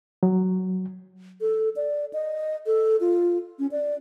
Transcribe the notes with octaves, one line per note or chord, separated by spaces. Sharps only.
F#3
A4
D5
D#5
A4
F4
C#4
D5